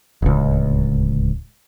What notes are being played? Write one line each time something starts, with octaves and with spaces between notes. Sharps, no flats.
D1 C#2